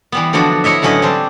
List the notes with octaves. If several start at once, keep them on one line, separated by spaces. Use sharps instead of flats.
E3 G3 B3
D3 F3 F#3 B3 D4 F#4
E4 C#5 D#5 E5
A2 D3 F#3 C#4 B4 D#5
G3 C4 D4 C5